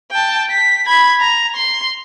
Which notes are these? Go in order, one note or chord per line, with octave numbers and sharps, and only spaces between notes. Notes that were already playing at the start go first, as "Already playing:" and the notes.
G5 A5
B6
B5 G#6
A#5
C6